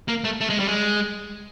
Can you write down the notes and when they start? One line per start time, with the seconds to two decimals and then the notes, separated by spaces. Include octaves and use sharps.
0.08 A#3
0.24 A3
0.41 A3
0.50 G#3
0.60 G3
0.68 G#3